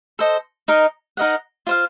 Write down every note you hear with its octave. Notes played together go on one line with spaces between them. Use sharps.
A4 C5 D#5
D#4 A#4 D#5
D#4 A#4 D#5 F#5
F4 C5 F5